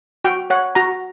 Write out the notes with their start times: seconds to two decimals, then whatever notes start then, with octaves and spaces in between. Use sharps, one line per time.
0.24 F#4 G5
0.50 C#5 F#5
0.75 F#4 A#5